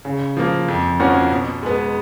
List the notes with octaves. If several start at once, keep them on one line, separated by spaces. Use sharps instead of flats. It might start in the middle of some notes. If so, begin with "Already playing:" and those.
C#3
F3 A#3
F2
F3 A#3 C#4 F#4
B2
G#3 B3